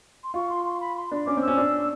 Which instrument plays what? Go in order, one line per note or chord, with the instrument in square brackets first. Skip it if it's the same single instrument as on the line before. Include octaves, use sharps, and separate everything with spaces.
[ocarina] C6
[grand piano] F4 [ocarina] C#6
[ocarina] C6
C6
B5
C6
[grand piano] D4
[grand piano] C#4 [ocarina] D6
[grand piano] C4 [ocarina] E6
[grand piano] C#4
D4